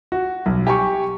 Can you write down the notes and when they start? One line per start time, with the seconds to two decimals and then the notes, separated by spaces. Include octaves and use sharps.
0.12 F#4
0.46 B1
0.67 G4 G#5 C#6